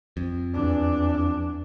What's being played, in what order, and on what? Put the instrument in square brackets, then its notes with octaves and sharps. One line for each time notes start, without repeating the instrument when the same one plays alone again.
[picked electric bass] F2
[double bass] E2 D4